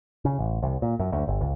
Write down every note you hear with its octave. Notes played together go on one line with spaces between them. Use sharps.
C#3
A1
C2
A#2
F#2
D2
G1
C#2